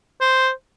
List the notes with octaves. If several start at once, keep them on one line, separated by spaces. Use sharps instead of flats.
C5